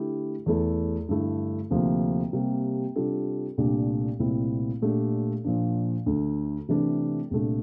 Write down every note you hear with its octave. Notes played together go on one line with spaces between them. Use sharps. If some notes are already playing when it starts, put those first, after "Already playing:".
Already playing: D3 A3 E4 G4
E2 E3 A3 E4 A4
G2 D3 A3 E4
D2 C3 F3 A#3
C3 G3 A#3
C3 G3 D4 F4 A4
C2 A#2 A3 D4 G4
C2 A#2 A3 C4 E4
A#2 A3 D4 G4
A#2 F3 A#3 D4
D2 D3 A3
C3 E3 A3 D4
C2 A#2 A3 D4